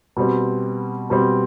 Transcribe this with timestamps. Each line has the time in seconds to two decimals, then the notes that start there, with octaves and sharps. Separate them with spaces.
0.17 B2 G3 C4
1.10 B2 G3 C4